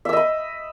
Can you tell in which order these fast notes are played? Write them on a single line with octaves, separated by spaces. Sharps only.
E5 E6 D#5 B5